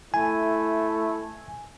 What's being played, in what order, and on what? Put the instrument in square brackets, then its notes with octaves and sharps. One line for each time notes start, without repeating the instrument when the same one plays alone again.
[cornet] A3 [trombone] E4 [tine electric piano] G#5